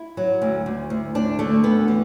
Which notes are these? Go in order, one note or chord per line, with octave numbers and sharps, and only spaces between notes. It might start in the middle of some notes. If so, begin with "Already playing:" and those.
Already playing: E4
F#3
D2
D2
D2
D2 D4
D3 A3
D2 B3
E3